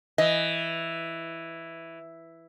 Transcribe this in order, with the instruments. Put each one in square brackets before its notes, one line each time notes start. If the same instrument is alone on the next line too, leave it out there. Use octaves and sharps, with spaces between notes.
[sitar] E3 [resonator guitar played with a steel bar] D#5